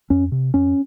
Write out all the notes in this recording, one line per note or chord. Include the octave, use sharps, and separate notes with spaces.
F2 C#4
C3
F2 C#4